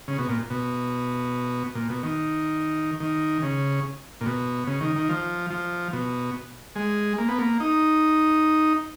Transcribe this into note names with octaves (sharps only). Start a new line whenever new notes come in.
C#3
B2
A#2
B2
A#2
B2
D#3
D#3
C#3
A#2
B2
C#3
D#3
D#3
F3
F3
B2
G#3
A#3
B3
A#3
D#4